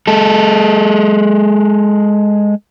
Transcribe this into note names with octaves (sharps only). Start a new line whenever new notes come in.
G#3 A4